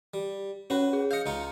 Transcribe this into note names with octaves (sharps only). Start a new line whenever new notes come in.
G3
C#4 F#4 B4 C#5
G#4
D#5 F5 G6 C#7
C#2 D#4 F4